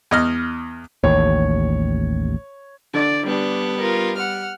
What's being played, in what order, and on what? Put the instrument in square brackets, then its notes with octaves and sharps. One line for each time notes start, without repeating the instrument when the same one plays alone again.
[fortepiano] E2 D#5 F6
[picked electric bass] A1 D#2 [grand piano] C#5
[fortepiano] D3 [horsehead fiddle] D5
[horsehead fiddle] G3 [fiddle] B3 [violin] D4
[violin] F4 A#4
F#5 F6